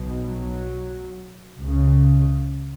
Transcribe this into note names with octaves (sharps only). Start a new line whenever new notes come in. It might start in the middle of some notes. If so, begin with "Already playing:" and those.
Already playing: B1 B2
F#3
C#2 C#3